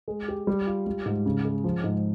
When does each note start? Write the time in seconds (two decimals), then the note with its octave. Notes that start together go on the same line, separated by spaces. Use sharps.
0.08 G#3
0.28 G4
0.47 G3
0.67 F4
0.87 G3
1.06 G#2
1.26 C#3
1.45 G#3
1.64 F3
1.84 G#2